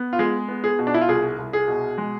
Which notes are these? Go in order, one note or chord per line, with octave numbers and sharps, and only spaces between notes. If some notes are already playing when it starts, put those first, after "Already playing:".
Already playing: B3
F4
G#3 G#4
B3
G#4
B2
D4
E4
F4
C2 G#4
C2
G#4
B2
G#3